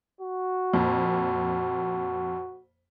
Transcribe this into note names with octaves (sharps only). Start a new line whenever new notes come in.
F#4
F2 A#2